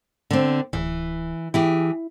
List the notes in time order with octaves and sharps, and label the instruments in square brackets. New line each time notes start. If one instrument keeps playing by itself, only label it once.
[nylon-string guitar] D3 C4
[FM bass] D1 [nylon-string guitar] E3
[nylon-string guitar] E3 G4 G#4 [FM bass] E4